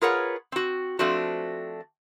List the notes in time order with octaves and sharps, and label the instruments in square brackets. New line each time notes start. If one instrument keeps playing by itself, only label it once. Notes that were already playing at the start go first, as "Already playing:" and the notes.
[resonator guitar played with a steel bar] F4 G#4 A#4 B4 C#5 F#5
C4 F#4
F3 A3 C4 D4 F#4